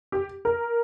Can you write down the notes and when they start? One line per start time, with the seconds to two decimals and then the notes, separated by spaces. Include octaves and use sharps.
0.12 G4
0.45 A#4